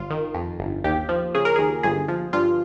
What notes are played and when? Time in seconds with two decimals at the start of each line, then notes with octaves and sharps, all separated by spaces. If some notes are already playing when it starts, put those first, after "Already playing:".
Already playing: G1 F4
0.10 D#3
0.35 F2
0.59 G1
0.84 D#2 G4
1.09 F3
1.34 C#3 G#4
1.45 A#4
1.56 D#2 G#4
1.83 G1 G#4
2.08 F3
2.33 G2 F4